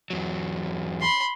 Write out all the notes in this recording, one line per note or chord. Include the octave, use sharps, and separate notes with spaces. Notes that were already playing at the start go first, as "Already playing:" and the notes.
E2 F#3
B5 C6